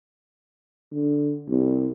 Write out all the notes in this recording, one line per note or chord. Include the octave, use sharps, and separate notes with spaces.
D3
C2